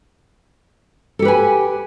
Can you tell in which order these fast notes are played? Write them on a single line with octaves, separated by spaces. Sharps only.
A4 G4 B4 G#5